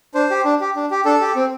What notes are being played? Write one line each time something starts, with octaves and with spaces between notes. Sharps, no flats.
D4 C5
G4
D4
G4
D4
G4
D4 A4
G4
C4